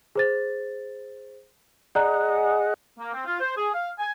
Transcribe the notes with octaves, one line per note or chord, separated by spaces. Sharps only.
G#4 C5 A6
G#4 D5 D#5 F#5 A#5 F#6
A#3
C4
F4
C5
G#4
F5
G#5